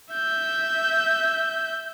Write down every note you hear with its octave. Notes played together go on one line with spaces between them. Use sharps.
E5 G6